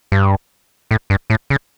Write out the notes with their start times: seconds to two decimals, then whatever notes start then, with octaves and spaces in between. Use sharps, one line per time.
0.12 G2
0.91 A2
1.10 G2
1.30 A2
1.50 C#3